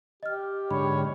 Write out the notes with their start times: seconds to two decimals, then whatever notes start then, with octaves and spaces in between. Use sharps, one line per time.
0.23 G4 D#5 F6
0.71 G#2 D3 C#5 B5